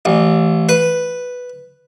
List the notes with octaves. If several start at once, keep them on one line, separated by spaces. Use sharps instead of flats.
A1
B4